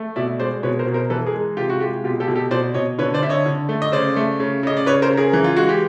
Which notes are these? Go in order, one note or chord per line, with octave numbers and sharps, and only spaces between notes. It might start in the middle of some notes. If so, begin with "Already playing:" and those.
Already playing: A3
B2 D5 E5
G#3 C5 D5
B2 B4 C#5
A#4 C5
B2
A#4 C5
E3 A4 B4
G#4 A#4
G#3
C3 F4 G4
F#4
G#3 F4 G4
B2 F4 G4
G4 A4
B2
G4 A4
B2 C5 D5
B2 C#5 D#5
D3 B4 C#5
C5 D5
D3 E5
C#5 D#5
D3
A3
D#5
C#3 C5 D5
A3
C#3
C#3 D#5
D5
C#3 B4 C#5
A#4 C5
C#3
G#4 A#4
E3
F4
G#3 F#4
G4